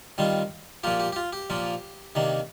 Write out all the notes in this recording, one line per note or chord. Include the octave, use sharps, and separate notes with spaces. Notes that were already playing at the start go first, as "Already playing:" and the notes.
D#3 G3 C4 F4
A#2 F3 A#3 F4 G4
G4
G4
F4
G4
A#2 F3 A#3 F4
C3 D#3 A#3 D4